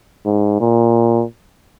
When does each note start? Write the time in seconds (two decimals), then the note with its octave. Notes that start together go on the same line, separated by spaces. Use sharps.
0.25 G#2
0.60 A#2